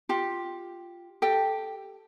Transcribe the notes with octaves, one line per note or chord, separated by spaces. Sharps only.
F4 G4
G4 A4 G5